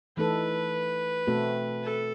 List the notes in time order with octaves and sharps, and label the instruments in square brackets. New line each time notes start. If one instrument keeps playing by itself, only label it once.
[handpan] E3 A3 D#4 A4 [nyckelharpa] B4
[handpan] B2 A3 C4 F#4 A4
[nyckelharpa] A4